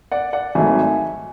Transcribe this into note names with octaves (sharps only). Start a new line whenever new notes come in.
D5 F#5
D5 F#5
G#1 G#2 F#3 A3 E5 G#5